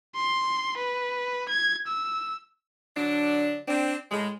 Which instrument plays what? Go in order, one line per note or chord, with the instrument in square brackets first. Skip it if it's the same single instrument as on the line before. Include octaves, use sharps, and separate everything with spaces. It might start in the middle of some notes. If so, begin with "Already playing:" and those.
[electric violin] C6
B4
G#6
E6
[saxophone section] D3 F#3 D4
C4 D4
A2 G#3